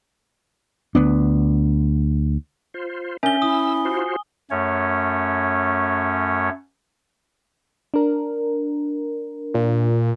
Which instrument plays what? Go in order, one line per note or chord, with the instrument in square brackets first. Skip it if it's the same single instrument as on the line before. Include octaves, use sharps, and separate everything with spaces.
[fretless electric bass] D2 B3 D4
[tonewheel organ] F4 C5
[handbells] C#4 E5 [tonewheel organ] D4 A#4 [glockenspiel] G#5 G7
[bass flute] E4 [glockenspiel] D#6 [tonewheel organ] E6
[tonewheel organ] F4 F#4 C5
[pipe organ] F#2 A3 C#4 C#5
[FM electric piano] D4 A#4
[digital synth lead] A#2